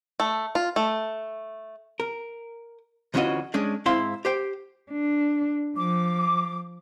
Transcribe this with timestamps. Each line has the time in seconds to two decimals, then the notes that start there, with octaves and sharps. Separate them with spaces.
0.20 A3
0.55 F4
0.76 A3
2.00 A#4
3.14 D2 E3 C#4 F4 F#4 D#5
3.54 G#3 C#4 D4
3.86 G#2 C4 E4 F5 C6
4.25 G4 C5 G5
4.92 D4
5.77 F3 D6